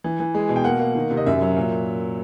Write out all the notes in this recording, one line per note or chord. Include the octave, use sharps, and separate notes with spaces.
E3
E3
G#3
B2
G5
A#3 F#5
A#3
D#3
C3
D#5
F#2 E5
F#3
A#2